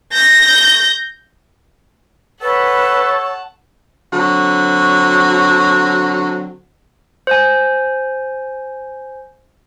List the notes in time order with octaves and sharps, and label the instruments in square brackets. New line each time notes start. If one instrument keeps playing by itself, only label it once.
[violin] G6 A#6
[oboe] A4 [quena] B4 [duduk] C#5 [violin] F#5 A5
[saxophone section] D3 F#3 C4 F#4
[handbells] C5 G#5